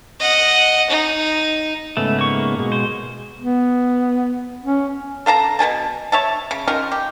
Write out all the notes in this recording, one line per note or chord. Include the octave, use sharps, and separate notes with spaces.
D#5 F#5
D#4
G#2 C#3 A3 B3
A#3 C#6
B2 G#3
C5
B3
C#4
A4 F5 A5 A#5
B2 A#4 G#5 A5
C#5 E5 A5
C#3
D#3 C#4 F4 A#4
G4